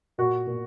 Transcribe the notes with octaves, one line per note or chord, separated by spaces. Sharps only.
A#2 F#4
A#2